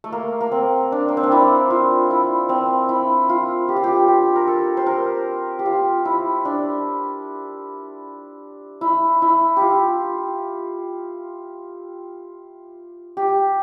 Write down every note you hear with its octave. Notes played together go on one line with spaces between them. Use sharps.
A3
A#3
A#3
C4
D4
A#3
C4
D4
E4
F4
E4
C4
E4
F4
G4
F4
G4
G4
A#4
A4
C5
A#4
G4
F4
E4
D4
E4
E4
F4 G4
G4